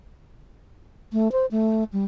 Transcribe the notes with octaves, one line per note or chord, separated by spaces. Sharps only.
A3
C5
A3
G3